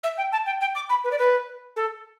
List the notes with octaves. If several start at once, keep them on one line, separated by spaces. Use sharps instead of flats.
E5
G5
A5
G5
G5
D6
B5
B4
D5
B4
A4